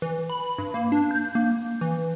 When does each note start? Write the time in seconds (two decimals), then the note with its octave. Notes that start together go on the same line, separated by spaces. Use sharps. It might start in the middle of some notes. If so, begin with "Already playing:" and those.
0.02 E3
0.30 B5
0.58 G2
0.74 A#3
0.92 D4
1.11 G6
1.35 A#3
1.81 E3